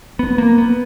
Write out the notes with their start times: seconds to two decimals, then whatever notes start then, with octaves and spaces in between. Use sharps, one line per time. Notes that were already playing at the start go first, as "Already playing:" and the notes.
0.19 B3
0.38 A#3
0.58 B3